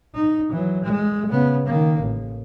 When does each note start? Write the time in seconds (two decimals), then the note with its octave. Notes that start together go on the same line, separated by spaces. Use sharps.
0.14 D#4
0.52 E3 F#3
0.84 G#3
1.31 C#3 B3
1.67 D#3 A#3
2.00 A1